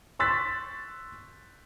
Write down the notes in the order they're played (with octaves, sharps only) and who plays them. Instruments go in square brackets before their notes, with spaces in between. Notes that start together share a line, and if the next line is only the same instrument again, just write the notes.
[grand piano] C6 C#6 E6 F#6 A6 B6